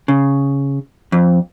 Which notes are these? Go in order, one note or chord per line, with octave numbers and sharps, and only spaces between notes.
C#3
F2